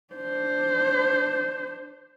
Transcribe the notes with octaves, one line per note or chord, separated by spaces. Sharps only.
D4 C5